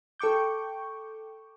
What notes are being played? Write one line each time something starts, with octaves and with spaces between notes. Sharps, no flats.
A4 G5 C#6 D6 G6